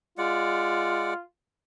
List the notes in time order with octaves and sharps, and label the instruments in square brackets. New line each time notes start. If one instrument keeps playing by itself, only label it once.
[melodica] G#3 D5 F#5 [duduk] F4